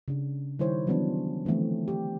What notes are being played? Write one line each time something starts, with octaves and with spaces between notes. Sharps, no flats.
C#3 D4
D#3 G3 E4 C5 C#5
E3 F#3 G3 B3 C#4 D4
D3 E3 F3 A3 C4
G4